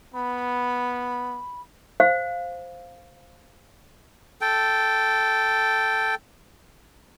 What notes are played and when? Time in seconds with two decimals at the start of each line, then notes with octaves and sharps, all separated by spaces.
0.14 B3 B5
2.00 C5 F5
4.41 A4 G5